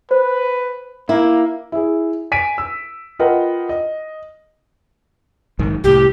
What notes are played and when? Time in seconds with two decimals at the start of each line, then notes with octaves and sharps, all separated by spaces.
0.11 B4 C5
1.09 A#3 E4
1.72 E4 G#4
2.32 G#5 B6 D7 D#7
2.58 E6
3.19 F4 A#4 B4 D#5 F#5 G5
3.69 D#5
5.59 A#1 G#2 D#3
5.84 C2 A2 G4